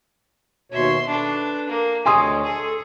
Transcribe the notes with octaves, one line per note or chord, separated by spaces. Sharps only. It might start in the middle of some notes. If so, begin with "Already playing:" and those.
D#2 B2 C#5 E5 C6
D4 A4 B4
A#3
D2 G#3 C#5 G#5 C6 D#6
G#4 A4